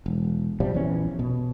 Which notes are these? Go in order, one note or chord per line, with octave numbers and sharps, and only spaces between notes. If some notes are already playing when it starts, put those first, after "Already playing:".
E1
B1 C3 F3 G3
A#1 E2 E3 C#4
B2